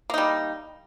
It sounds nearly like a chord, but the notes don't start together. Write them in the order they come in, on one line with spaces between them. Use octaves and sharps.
A#3 D#4 G3